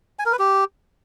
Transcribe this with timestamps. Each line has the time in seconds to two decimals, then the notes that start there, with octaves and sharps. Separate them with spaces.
0.19 G#5
0.26 A#4
0.32 B4
0.39 G4